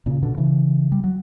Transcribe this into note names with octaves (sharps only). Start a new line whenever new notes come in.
A#2 C#3
B2 D3
C#3 E3
G3
F#3